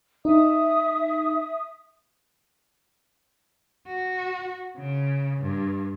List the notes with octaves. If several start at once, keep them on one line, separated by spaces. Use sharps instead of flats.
D#4 E5 D#6
F#4
C#3
G2